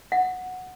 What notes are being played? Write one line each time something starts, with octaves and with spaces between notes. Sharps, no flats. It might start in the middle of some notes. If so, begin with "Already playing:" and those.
F#5